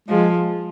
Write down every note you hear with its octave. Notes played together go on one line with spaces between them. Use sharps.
F3 G#3